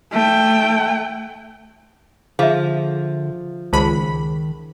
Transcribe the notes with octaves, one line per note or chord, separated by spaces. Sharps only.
A3 G5
D3 F3 G#4 E5
C#2 D#3 G#4 C5 A5 B5